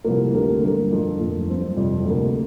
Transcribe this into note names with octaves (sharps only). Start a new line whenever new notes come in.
C2 C3 F3 A#3
D2 D3 A#3 G4 A#4
G2 D3 G3 A#3
F1 F2 D3 A#3 F4
F1 F2 F3 A#3
G2 F3 C4
F2 C3 G3
D2 C3 A#3